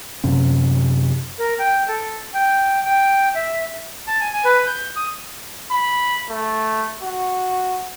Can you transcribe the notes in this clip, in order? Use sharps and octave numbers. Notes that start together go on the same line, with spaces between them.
F#2 C3 C#4
A#4
G5
A4
G5
G5
E5
A5
G#5
G#5
B4
G6
D#6
B5
A3
F#4